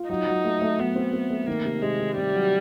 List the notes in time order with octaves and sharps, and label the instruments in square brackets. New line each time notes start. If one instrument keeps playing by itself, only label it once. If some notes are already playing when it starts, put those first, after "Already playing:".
Already playing: [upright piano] F4
[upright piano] F#3 [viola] D#4
[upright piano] F#3
A3
A3
[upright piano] F#3 [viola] B3
[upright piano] C4
C4
A3
[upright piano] D#3 [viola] A#3
[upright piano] C3
[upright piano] C3 [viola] G#3
[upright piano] D#3
[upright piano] C3 [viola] G3
[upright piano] F#3